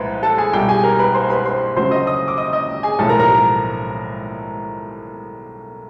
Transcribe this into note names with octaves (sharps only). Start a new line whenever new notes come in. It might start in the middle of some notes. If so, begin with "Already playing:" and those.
Already playing: C2 A#2 F3 G#3 B4 C5
A4 A5
G#4 G#5
C2 B2 G3 G4 G5
G#4 G#5
A#4 A#5
B4 B5
C5 C6
B4 B5
C5 C6
D2 C#3 F#3 C5 C6
D#5 D#6
D#5 D#6
D6
D#5 D#6
D#5 D#6
G#4 G#5
B1 A2 F3 G#3 A4 A5
A#4 A#5
A#4 A#5